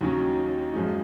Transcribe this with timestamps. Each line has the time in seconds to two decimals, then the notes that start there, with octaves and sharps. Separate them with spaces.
0.01 D#2 D#3 F#3 C#4
0.74 F#2 F3 G#3 D#4